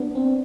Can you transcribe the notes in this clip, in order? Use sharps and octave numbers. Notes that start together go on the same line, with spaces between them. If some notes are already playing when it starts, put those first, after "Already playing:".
Already playing: B3 D4
C4